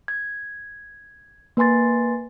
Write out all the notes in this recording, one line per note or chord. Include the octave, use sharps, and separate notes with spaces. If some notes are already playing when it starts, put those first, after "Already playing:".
G#6
A#3 B4 G#5 C6 A6